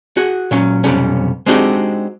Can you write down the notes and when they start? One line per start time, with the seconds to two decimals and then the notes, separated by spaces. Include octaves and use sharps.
0.17 F#4 G#4
0.51 A#2 F#3 C#4
0.84 B1 F2 C3 G3 C#4
1.46 G#3 C4 D4 D#4 F#4 G4